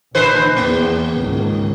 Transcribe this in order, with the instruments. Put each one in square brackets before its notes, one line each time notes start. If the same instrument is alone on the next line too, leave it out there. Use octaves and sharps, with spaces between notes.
[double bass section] A#1 [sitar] D3 B4 C5
[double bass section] E2 [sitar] A#3
[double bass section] C#2 G#2 D#3